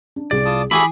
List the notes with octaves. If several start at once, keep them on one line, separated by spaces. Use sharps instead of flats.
D4
C2 G#4 D5
F4 A5 D#6
E3 E4 F#4 G#4 A4 G#5 B5 D6